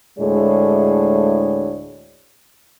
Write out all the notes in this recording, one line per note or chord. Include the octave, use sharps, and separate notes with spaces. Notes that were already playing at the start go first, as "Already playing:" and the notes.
D2 A2 G#3 D4 G#4 C#5